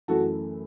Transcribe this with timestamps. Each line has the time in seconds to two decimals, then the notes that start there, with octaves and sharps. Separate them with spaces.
0.08 F#2 E3 A3 F#4 A4